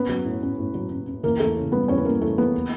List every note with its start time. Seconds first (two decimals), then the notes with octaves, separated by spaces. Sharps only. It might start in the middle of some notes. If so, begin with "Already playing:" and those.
Already playing: B3 C#4 B4
0.09 F#3
0.26 A2
0.43 C#4
0.59 A2
0.74 F#3
0.91 C#4
1.07 C#4
1.23 E3 A#3 A#4
1.39 E2 A3 A4
1.57 C#3
1.72 G3 B3 B4
1.88 E2 C#4 C#5
1.98 B4
2.05 G3 A#3 A#4
2.21 E3 A3 A4
2.38 E3 B3 B4
2.54 A#3